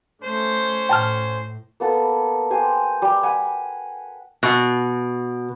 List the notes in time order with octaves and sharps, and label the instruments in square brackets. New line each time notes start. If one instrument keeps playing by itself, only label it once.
[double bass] A3 [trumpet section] C#4 C5
[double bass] A2 [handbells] G5 A5 F6
[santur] A#3 B3 A4
G4 C5 G#5
G3
F#5 G#5 B5
[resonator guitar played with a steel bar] B2